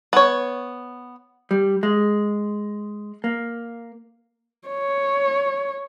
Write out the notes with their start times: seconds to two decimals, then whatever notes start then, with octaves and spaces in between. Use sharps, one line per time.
0.13 B3 C#5
1.51 G3
1.83 G#3
3.24 A#3
4.68 C#5